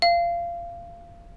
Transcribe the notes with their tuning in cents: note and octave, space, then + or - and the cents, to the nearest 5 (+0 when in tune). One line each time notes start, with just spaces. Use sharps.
F5 -20